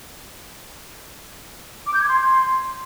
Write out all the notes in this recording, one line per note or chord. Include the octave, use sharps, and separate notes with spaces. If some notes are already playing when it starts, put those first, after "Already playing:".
D6
G6
G#6
C6